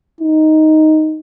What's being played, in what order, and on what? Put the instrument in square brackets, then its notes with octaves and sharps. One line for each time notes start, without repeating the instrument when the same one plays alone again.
[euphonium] D#4